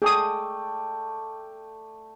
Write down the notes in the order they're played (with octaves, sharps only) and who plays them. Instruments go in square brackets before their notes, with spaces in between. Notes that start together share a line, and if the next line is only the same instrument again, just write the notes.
[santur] A3 D5 G5 [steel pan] G#4 D#6